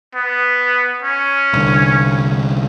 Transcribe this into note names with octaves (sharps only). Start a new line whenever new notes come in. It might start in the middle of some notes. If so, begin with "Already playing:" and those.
B3
C#4
C2 D3